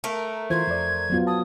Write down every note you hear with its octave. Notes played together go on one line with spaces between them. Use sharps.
A3 A#4
E3 F4 C5 G#6
F2 D5
F#3 B3 F4
A5 D#6